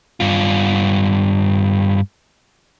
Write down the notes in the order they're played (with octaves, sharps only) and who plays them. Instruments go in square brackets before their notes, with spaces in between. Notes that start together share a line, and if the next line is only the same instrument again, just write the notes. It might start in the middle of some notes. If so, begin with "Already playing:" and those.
[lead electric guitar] G2 F4